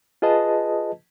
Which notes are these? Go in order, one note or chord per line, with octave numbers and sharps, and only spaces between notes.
F4 G#4 B4 D#5 A5